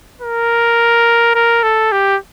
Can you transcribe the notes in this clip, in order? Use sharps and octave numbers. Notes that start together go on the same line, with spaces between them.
A#4
A#4
A4
G4